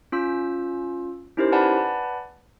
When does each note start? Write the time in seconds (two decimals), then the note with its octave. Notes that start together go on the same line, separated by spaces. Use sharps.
0.12 C#4 F4 E6
1.37 C#4 D#4 E4 G4 A#4 C5
1.52 B4 D5 F#5 G#5 A5 B5